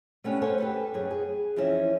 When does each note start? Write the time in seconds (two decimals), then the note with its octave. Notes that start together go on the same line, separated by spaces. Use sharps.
0.24 A3 B3 C#4 D4 G4
0.42 A4 C5 C#5 F#5 G#5
0.58 G4 A4 B4
0.94 F#2 G#4
1.11 G#4
1.56 F2 E3 F3 C#4 E5